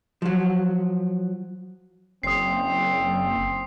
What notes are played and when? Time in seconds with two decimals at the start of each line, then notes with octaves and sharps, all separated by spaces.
0.22 F3 F#3
2.23 F#1 C4 D#6 C7